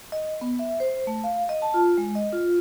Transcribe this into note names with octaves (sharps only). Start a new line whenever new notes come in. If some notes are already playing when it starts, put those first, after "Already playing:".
D#5
B3
E5
C5
A3
F5
D#5
A5
F4
G#3
D#5
F4